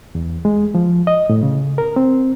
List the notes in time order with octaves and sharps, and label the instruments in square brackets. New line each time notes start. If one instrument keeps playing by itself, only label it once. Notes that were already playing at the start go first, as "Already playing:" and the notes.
[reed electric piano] E2
G#3
F3
D#5
A2
C#3
A#4
C4